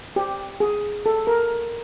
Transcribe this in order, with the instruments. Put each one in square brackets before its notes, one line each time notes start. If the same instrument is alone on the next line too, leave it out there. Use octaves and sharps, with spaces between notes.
[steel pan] G4
G#4
A4
A#4